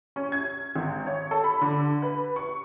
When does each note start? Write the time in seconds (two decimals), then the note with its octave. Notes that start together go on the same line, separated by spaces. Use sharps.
0.16 C#4
0.32 G#6
0.76 G#1
1.07 C#5
1.31 A4
1.44 B5
1.61 D3
2.02 B4
2.36 C#6